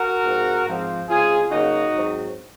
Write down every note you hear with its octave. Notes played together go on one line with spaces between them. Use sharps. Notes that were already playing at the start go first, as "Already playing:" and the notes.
Already playing: F#4 A#4
G#2 F3 C4
G#2 F3 C4
C#3 G#3 C4 F4 G#4
C#3 F#3 A#3 D#4 F#4
G#2 F#3 C4